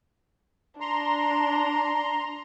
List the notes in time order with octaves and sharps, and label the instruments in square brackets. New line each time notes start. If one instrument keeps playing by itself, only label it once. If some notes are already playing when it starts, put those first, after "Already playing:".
[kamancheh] D4 [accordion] A#5 C6